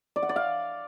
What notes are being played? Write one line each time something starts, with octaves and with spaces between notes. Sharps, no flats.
D5
F#5
D5
F5